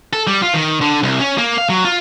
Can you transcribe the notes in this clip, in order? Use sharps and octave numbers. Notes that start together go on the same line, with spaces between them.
A4
G3
F4
D#3
D3
C2
C#4
A#3
F5
F#3
F4